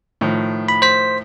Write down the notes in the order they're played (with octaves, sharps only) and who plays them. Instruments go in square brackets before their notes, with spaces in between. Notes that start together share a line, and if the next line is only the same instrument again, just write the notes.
[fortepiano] A2 D#3 F3
[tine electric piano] B5
C5 B6